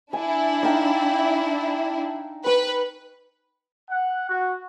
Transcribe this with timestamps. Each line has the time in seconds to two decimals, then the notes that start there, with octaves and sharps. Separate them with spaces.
0.13 D4 E4 G#5
0.63 D#4 F5 G5
2.46 B4 C#6
3.91 F#5
4.30 F#4